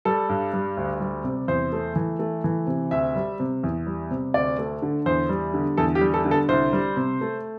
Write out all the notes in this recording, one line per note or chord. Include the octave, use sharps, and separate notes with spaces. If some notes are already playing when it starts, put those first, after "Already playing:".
G3 A4
G2
G3
D2
G3
C3
E2 C5
A3
E3
A3
E3
C3
D2 E5
G3
C3
E2
G3
C3
D2 D5
A3
D3
E2 C5
G3
D3
E2 A4
G4
G3
A4
D3
A4
C2 C5
G3
C3
A3